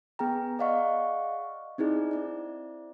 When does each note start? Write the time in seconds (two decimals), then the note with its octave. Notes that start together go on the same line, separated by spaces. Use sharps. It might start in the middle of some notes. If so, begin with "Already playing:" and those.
0.19 B3 G#4 G5 A#5
0.59 G#4 D5 D#5 F5 F#5 C#6
1.78 C4 D#4 E4 G#4 D5
2.11 C4 E4 D5